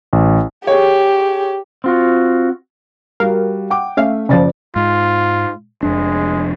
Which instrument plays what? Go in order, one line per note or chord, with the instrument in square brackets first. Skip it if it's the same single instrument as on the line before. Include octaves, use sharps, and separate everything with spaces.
[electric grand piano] A1
[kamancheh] G4 [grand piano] G#4 C#5
[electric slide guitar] C4 F4 F#4
[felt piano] G3 F#4 [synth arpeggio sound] A#4 F5
[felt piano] F#5 G5 D6
[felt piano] A3 E5 [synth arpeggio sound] C#4 F5
[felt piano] F#1 D5 A6 [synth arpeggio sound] F3 C#4
[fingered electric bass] G#2 [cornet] F4
[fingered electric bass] F1 F2 D4 [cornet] G#3